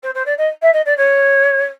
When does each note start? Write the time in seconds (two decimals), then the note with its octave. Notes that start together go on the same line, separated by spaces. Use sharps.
0.03 C5
0.14 C5
0.26 D5
0.38 D#5
0.62 E5
0.73 D#5
0.85 D5
0.97 C#5